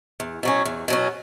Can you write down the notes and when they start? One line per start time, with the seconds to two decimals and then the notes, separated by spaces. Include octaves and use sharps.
0.20 E2
0.43 B2 F#3 C#4
0.65 E2
0.88 B2 F#3 C#4